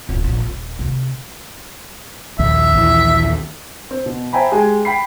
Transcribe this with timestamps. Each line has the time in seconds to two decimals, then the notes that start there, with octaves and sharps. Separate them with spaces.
0.09 D1 A#1
0.24 A#1
0.41 D#1
0.79 C3 A#3
2.39 A#1 D#2 E5
2.74 A#1 D#2 E3
3.91 C4
4.06 B2
4.33 C5 E5 G5 G#5 A#5 B5
4.52 G#3 G4 G#4 G5 G#5
4.85 G5 B5 C7